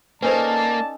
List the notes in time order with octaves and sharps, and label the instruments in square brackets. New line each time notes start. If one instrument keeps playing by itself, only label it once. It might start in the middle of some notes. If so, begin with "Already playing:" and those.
[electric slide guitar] A#3 [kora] C#4 D#4 A4 [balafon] B4 C5 [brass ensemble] D5 A5